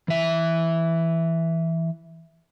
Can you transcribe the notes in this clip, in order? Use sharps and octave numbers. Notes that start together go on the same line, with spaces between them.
E3 E5